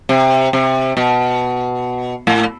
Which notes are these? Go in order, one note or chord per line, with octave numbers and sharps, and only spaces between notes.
C3
C3
B2
A2